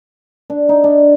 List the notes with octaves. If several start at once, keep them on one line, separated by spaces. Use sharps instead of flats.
D4
D#4
D4